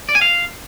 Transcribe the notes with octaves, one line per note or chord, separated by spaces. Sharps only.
D5
G#5
F5